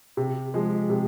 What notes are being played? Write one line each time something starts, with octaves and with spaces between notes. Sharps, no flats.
C3
F3 G#3
C3